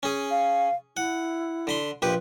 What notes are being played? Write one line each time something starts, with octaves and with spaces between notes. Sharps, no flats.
C#4 G#4
F5
E4 F#5
D3 B5 C6
A#1 F4 G4 B4